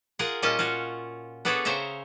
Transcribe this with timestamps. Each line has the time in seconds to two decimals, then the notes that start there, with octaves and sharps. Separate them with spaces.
0.19 F4 G#4 A#4 F#5
0.42 A#2 G3 C#4 F4 D#5 A5
0.59 F4 F#4 C#5
1.45 B3 D4 G#4 A4 B4 C#5
1.65 C#3 C5 C#5 E5 A#5